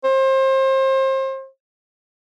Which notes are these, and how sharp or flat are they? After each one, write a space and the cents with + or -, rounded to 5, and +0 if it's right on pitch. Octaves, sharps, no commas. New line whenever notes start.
C5 +30